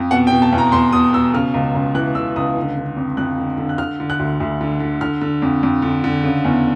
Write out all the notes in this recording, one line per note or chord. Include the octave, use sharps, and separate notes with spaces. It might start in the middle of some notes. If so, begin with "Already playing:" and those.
Already playing: F2
B2 F#5
G5
B2
A5
E2
A#5
E2 C6
B2 D#6
B2 E6
C#3 F6
C#2
C#2
E3 F#6
C#3 E6
C#2 D#6
D3
D3
F2
F2 F#6
D3
D3
F#6
D3 F6
D3
F#6
D2
D2
D3
D3
D3 F6
D3
F2
F2
D3
D3
C#3
E2